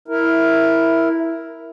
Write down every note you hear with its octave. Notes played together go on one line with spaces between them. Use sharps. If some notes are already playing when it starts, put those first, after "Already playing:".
E4 A#4